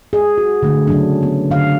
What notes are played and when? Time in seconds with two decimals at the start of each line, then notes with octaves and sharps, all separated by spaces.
0.13 G#4
0.38 F#4
0.63 D3 A3
0.87 C#3 F#3 D4
1.23 B3
1.51 D3 F5